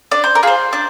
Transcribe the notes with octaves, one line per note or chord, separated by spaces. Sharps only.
D4 D5
C5
A#4
F4 G#4 C5
D4